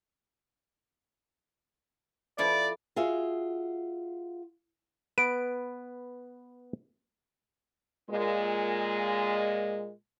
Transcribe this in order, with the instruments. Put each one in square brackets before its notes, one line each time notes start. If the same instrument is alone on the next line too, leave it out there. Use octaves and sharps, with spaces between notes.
[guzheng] F3 E4 A4 [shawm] D5
[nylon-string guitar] F4 F#4 G#4 E5 F5
[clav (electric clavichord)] B3 B4 [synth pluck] D7
[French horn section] A#2 G#3